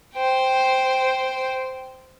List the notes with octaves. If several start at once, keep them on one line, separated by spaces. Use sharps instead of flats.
C5 G5